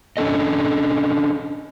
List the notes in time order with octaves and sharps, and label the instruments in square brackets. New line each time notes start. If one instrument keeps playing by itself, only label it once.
[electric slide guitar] C#4 D4 A4 D#5